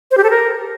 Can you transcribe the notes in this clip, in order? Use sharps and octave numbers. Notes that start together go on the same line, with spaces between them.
C5
G4
A4
A#4